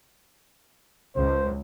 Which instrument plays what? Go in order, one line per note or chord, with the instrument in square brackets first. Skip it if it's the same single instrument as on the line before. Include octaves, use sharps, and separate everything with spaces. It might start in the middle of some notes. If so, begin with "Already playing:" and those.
[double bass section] C#2 [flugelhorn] C5